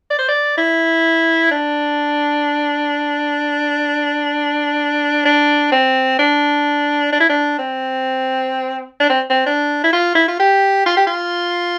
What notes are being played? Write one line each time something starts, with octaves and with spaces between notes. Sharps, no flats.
D5
C5
D5
E4
D4
D4
C4
D4
D4
E4
D4
C4
D4
C4
C4
D4
E4
F4
E4
F4
G4
F4
G4
F4